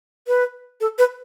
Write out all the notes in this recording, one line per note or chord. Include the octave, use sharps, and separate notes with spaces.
B4
A4
B4